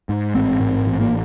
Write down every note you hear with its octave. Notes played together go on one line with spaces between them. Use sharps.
G#2
A1 C4
G#2
A1
A#3